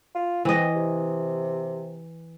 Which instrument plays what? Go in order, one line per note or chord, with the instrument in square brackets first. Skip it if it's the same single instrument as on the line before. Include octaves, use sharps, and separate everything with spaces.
[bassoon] F4
[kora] E3 D#5 [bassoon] C4
[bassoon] C3